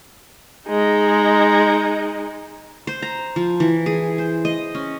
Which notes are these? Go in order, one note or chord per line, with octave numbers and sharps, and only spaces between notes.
G#3 D#4
C5
A#5
F3
E3
G#4
C5
D#5
C#4